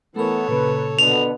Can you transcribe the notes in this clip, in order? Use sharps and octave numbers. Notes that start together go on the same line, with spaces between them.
E3 A3 B3 A4 A#4 C#5
A#2 C#3 B4
B2 D3 B3 F7